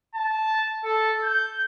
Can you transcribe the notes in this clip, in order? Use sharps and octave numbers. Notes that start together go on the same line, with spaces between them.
A5
A4
G6